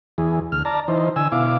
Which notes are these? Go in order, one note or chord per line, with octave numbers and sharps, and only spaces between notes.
E2 E3 G#4
D2 F6
D5 A5 A#5
E3 D#4 C5
D3 G#5 E6
B2 E4 F5 D6